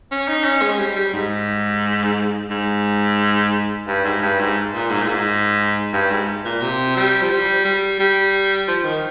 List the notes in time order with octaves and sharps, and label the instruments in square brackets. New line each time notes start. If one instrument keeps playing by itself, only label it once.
[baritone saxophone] C#4
D#4
C#4
G#3
G3
G3
G#2
G#2
G2
G#2
G2
G#2
A#2
G#2
A#2
G#2
G2
G#2
A#2
C3
G3
F3
G3
G3
G3
F3
D#3